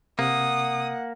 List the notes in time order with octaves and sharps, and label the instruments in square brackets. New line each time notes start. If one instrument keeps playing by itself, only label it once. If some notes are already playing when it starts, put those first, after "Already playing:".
[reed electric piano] C3 [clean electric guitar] A#3 [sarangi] F#5 [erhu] D#6